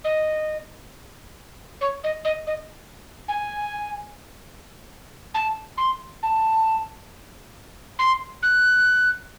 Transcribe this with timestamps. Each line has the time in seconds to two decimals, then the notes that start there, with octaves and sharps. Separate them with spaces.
0.04 D#5
1.81 C#5
2.04 D#5
2.25 D#5
2.47 D#5
3.28 G#5
5.34 A5
5.78 C6
6.23 A5
7.99 C6
8.43 F#6